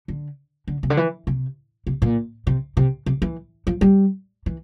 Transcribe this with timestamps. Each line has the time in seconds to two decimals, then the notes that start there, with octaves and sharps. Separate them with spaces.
0.08 D3
0.68 D3
0.83 C3
0.90 D3
0.97 E3
1.27 C3
1.87 C3
2.02 A#2
2.47 C3
2.77 C3
3.06 C3
3.22 E3
3.67 F3
3.81 G3
4.46 E3